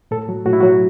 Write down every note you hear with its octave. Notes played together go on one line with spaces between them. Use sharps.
A2 A4
F#3
A2 F#4
E4
F#3 F#4